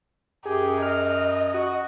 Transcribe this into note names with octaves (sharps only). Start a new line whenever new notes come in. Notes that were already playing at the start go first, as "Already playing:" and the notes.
F#2 G4 G#4
D#5 F6
F#4